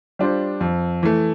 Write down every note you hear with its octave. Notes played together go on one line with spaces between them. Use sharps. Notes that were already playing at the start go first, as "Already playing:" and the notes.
G3 D4 F4 C5
F2
E3 A3